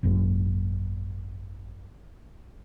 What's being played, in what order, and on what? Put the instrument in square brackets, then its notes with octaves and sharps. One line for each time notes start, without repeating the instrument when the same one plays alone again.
[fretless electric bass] G#1 F#2 A#2